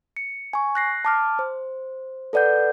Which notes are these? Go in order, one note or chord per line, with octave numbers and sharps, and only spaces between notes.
C#7
G#5 C#6
F#6 A#6 C7
A5 D6 F6
C5
A4 B4 D5 F#5 G6